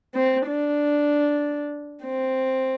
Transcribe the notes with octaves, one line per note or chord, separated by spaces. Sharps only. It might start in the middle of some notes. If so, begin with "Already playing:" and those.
C4
D4
C4